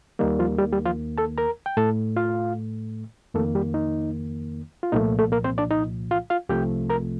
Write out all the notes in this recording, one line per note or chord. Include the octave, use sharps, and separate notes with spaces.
D#2 D#3 G3 A#3 D#4
F3 F4
G3 G4
G3 G4
F3 F4
A4 A5
A#4 A#5
G5
A2 A3 A4 A5
F4 F5
F2 D#3 A3 A#3 A4
G3 G4
D#4
F4
C2 A#2 F3 A3 D#4
A3 A4
A#3 A#4
C4 C5
D4 D5
D#4 D#5
F4 F5
F4 F5
C2 C3 F3 A3 G4 G5
A#4 A#5